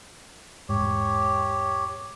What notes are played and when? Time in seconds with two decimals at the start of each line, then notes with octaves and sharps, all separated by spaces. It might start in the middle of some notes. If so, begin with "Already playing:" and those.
0.69 E1 G#2 G4 C#5